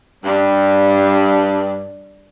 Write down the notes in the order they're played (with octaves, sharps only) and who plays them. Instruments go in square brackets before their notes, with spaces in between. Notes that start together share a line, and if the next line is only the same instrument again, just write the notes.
[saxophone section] G2 [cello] G3 D4